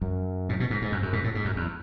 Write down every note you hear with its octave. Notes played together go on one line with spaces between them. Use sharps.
F#2
A2
B2
G#2
G#2
F#2
F#2
G#2
A2
G#2
F#2
E2